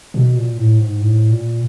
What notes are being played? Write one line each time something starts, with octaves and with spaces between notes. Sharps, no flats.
B2
A#2
A2
G#2
A2
A#2